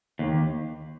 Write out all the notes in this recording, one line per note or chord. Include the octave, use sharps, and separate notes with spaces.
D#2